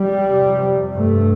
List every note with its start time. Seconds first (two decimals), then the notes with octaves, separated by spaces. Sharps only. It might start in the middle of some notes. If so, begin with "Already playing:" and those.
Already playing: G3
0.24 F2 C3
0.95 G2 A3